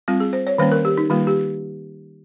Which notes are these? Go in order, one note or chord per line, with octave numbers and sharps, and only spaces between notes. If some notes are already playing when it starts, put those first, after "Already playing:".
G3 C4 F4
G#4
C5
C#5
D#3 G3 A#3 C#4 C5
A#4
G4
D#4
D#3 G3 A#3 F4
G4